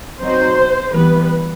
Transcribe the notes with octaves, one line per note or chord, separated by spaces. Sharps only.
B2 F#3 C4 D#4 F#4 C5
E3 G3 B3 B4